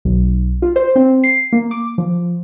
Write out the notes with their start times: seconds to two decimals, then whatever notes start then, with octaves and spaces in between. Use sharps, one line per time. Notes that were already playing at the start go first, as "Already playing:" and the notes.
0.05 B1
0.62 F4
0.76 C5
0.96 C4
1.24 C7
1.53 A#3
1.71 D6
1.98 F3